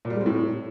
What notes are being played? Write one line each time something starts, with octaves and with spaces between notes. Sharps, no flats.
A#2
G3
G#3
C4
A2